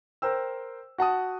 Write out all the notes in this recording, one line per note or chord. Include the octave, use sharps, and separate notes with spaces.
A#4 C5 G5 E6
F#4 F#5 A5 D#6